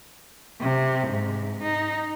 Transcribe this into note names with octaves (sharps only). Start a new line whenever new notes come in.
C3
G#2
D#4